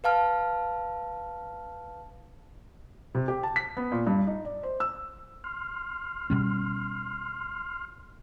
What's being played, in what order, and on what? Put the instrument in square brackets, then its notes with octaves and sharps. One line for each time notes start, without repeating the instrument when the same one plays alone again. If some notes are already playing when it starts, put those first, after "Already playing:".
[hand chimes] B4 F5 A5 F6
[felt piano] C3
G4
A5
B6
B3
A#2
G2
D#4
D5
C5
E6
[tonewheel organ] C6 F6
[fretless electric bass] B2 G3 C#4